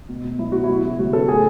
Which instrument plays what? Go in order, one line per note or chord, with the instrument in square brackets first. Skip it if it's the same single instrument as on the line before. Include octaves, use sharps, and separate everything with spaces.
[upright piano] B2
B2
F#3 E4
B2 F#4
E4
F#3
C#3
F#3 F#4
C#3 A4
A2 G#4